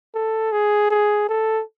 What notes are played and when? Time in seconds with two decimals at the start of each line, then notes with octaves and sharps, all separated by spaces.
0.15 A4
0.52 G#4
0.90 G#4
1.29 A4